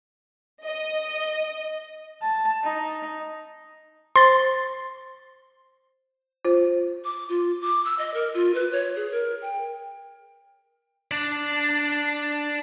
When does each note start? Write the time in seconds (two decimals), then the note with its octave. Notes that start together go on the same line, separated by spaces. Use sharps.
0.64 D#5
2.22 A5
2.64 D#4
4.16 C5 C6 A6
6.45 F4 C5
7.04 D6
7.29 F4
7.62 D6
7.85 E6
7.99 D#5
8.14 A#4
8.34 F4
8.55 B4
8.72 C#5
8.96 G#4
9.12 A#4
9.42 G5
11.11 D4 D5